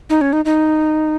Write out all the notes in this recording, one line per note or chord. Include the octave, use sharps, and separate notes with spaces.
D#4
C#4
D#4
D#4